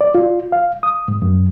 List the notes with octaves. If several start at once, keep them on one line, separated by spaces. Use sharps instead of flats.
D5
F4
F5
D#6
G#2
F#2